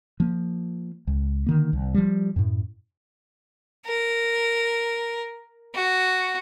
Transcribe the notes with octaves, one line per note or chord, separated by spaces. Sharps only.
F3 A#3
C#2
D3 D#3 A#3
C2
F3 G3
F#2 A2
A#4
F#4